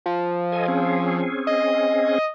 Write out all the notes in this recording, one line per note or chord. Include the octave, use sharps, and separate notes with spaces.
F3
A4 D#5 G#5
C4 C#4 G#4
D#5